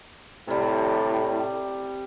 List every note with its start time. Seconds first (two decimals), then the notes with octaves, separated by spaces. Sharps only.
0.48 A2 C3 G3